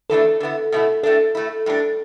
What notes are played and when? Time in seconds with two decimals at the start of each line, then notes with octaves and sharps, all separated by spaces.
0.10 E2 E3 A3 D4 A4
0.40 D3 B3 E4
0.72 B2 A3 E4
1.03 A2 A3 D4 A4
1.35 A2 A3 E4
1.66 A2 G3 D4